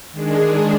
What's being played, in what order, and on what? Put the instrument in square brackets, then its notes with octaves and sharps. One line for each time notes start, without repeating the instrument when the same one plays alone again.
[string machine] D#3 G#3 D4 G#4